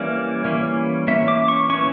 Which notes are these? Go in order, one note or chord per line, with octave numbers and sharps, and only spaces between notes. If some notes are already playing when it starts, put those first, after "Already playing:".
Already playing: E3 G3 A#3 C#4 D5
E3 G3 A#3 C#4
E3 A#3 C#4 E5
D6
C#6
E3 A#3 C#4 C#6